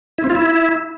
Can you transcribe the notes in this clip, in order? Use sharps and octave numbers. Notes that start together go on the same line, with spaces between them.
E4
C4
F4
E4